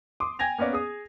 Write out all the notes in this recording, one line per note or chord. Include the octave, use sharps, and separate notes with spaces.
C6 D6 D#6
G5 G#5 G#6 A#6 F7
A#3 B3 C#4 D5
G#4 D#6